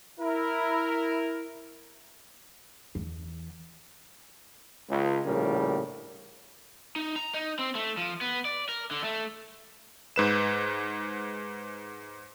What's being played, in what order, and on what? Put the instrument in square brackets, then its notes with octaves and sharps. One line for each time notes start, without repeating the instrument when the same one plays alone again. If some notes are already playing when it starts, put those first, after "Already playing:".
[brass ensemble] E4 A#4
[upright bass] E2 E3
[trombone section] C#2
A#1 A2 C#3 G3 A#4
[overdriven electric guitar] D#4
A#5
D#4
C4
A3
F3
B3
D5
A#4
D3
A3
[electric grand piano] G#2 B4 E7